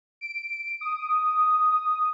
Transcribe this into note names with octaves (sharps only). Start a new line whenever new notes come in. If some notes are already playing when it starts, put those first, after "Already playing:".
D7
D#6